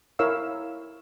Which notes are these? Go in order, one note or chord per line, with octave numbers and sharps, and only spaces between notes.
E4 A#4 C#5 F5 E6